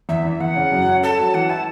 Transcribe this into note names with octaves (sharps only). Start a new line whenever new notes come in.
E2 E5
E3
E2 F#5
C#3
F#2
C#4
A4 A5
F#3
E3 F#5
E4 A5